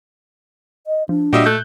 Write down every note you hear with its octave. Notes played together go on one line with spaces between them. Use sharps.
D#5
F3 D4
A#2 G3 F#4 D#5 E5 F6 E7
A3 F#6 G6